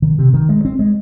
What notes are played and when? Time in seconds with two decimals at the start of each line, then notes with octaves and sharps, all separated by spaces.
0.02 D#3
0.19 C3
0.34 D#3
0.49 G#3
0.65 C4
0.79 G#3